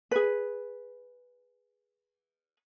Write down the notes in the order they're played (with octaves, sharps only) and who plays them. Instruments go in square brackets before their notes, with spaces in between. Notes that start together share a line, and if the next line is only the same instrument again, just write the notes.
[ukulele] G#4 B4